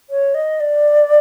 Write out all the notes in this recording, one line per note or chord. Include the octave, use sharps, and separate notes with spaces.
C#5
D#5
D5